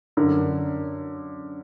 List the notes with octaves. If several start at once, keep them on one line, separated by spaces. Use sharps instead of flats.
F#2 D3 A#4